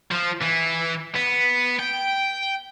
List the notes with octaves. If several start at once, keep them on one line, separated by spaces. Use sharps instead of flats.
F3
E3
B3
G5